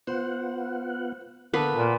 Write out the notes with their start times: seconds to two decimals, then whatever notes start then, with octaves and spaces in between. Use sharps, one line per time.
0.07 B3 F4 C5 F#5
1.54 D3 A#3 B3 A4 B4
1.75 A#2 F#5